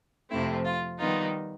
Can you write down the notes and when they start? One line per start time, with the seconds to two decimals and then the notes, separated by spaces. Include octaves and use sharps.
0.29 F2 C3 F3 A3 C4 E4
0.65 F4
0.98 D#3 G3 B3 D#4 F4